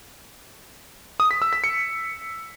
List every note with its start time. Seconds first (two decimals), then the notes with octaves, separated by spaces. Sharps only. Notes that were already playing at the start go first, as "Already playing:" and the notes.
1.20 D#6
1.31 B6
1.42 E6
1.53 B6
1.64 C#7